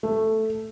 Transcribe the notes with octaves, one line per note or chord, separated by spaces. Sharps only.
A3